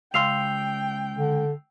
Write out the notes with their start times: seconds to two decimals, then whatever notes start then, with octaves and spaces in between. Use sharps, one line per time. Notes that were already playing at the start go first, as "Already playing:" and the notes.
0.14 C#2 F5 G5 C6 E6 C7 F7
1.14 D3